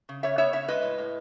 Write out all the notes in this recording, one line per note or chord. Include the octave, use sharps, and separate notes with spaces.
C#3
C#3 C#5 E5
B3 C#5 E5
C#3 C#5 E5
G#3 B4 D#5
A2
A2